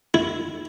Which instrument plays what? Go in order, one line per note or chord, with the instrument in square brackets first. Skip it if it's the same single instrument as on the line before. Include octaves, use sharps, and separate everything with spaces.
[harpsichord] E4